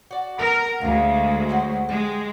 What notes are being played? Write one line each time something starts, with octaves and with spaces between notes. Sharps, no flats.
F#4 D5
B3 A#4
D2 G#3 A#3 F5
F#3 F#4 C5
G#3 G4